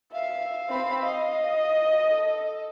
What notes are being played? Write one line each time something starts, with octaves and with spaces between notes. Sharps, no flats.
E5 F5
C4 B5
D#5
A4